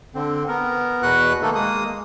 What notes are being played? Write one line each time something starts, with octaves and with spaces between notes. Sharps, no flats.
D3 C4
B3 A#4
E2 B2 F#4 B4 F#5 F#6
D#3 A3 A#3 D#4 A4
G#3 A#3 D#6